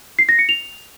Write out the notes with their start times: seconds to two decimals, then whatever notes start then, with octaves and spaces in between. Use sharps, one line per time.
0.19 C7
0.29 A#6
0.39 C#7
0.49 F7